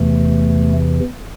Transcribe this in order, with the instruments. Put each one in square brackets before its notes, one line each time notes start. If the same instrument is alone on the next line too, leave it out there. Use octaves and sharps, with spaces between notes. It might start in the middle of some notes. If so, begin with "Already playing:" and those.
Already playing: [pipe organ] E2 C3 E3 A3